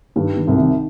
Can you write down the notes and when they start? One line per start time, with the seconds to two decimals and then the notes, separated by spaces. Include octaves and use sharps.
0.16 G2 D#3 G3
0.37 D#3
0.47 C2 C3
0.58 D#3